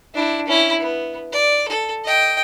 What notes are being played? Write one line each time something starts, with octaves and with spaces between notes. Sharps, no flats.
D4 E4
C#4 E4
B3
D5
A4
D#5 G5